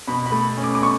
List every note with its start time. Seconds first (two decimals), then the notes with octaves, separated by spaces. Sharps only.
0.08 B2 B5
0.26 B5
0.32 A3
0.57 C#4
0.64 D6
0.75 D6
0.82 B2 C#6